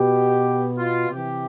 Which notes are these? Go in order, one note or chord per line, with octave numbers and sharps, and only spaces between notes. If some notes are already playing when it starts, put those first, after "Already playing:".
Already playing: B2 G4
F4
C3 E3 G4